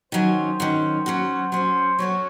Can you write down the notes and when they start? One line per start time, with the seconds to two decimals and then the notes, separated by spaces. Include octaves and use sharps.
0.12 D#3 F#3 C#4 C5
0.60 D#3 F#3 C#4
1.06 F#3 C#4 F#4
1.52 F#3 C#4 F#4 C5
1.99 F#3 C#4 F#4 A4 C#5